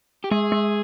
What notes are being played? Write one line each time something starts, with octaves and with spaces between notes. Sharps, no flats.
G4
G#3 G#4
G#3